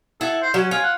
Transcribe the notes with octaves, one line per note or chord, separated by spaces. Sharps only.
E4 A4 F#5
C5
F#3 C#4
F4 G#5
F#5